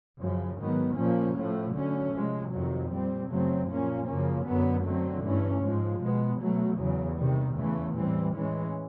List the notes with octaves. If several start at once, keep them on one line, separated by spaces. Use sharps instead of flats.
F#2 C#3 F3
G#2 D#3 F#3 B3
A#2 F3 A#3 C#4
A2 F3 A3
D3 F#3 A3 C#4
C3 F3 G#3
F2 C3 D#3 F#3
A#2 G3 C4
F#2 C#3 F#3 A3 C4
A#2 F3 A#3 C#4
F#2 C#3 F3 A#3 C#4
F#2 D3 F#3 B3
D3 F#3 A3 C4
G2 E3 A3 C#4
G#2 F3 G#3
B2 G#3 B3
B2 F#3 A3
E2 C#3 F#3
C3 D#3 G3
E2 C#3 E3 A3
A2 E3 G3 C4
A2 E3 G#3 C#4